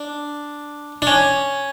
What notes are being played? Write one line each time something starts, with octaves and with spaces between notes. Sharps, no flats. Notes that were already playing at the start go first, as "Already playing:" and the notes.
Already playing: D4
D4
C#4